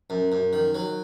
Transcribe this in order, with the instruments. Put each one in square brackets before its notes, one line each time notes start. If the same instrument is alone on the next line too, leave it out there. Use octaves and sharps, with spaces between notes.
[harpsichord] F#2
F#2
D#3
F#3